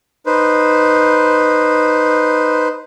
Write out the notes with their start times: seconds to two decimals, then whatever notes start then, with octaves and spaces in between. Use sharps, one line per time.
0.26 D#4 B4 C5